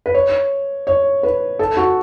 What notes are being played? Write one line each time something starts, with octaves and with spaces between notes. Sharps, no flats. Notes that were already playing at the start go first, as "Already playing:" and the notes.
B4
C#5
C#5
B4
A4
F#4